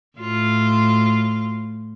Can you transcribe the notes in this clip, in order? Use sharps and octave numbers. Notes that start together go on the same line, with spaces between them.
A2 F4